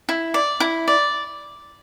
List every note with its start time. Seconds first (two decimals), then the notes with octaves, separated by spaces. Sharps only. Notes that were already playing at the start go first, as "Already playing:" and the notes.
0.09 E4
0.34 D5
0.60 E4
0.88 D5